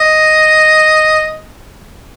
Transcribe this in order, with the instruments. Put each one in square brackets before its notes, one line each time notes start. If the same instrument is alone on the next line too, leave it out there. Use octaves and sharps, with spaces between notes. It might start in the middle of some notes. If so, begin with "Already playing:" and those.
Already playing: [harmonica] D#5